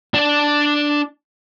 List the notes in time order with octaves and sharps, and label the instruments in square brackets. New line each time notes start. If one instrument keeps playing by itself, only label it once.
[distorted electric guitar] D4 D5